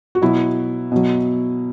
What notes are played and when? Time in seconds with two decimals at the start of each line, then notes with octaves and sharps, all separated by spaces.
0.15 F#4
0.22 B2 F#3 B3 E4
0.92 B2 F#3